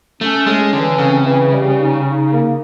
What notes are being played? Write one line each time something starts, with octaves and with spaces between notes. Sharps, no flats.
A3 C#4
A2 G#3
D3 E3
C#3 C4
E3
G3
D#4
D#4
A#3